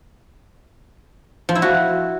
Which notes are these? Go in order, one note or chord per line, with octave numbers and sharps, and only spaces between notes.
F3
E4
F#4